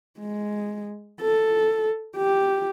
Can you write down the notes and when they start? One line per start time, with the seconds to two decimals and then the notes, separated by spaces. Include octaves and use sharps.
0.20 G#3
1.21 A4
2.17 G4